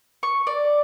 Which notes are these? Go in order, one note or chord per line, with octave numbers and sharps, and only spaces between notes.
C#6
D5